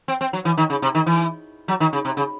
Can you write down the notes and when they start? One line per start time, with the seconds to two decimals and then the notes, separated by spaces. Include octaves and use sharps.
0.08 C4
0.21 C4
0.33 F#3
0.45 E3
0.58 D#3
0.70 C#3
0.82 C3
0.95 D#3
1.06 E3
1.68 F#3
1.80 D#3
1.93 C#3
2.05 C3
2.17 C#3